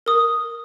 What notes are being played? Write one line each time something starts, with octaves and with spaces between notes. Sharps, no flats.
A#4 D#6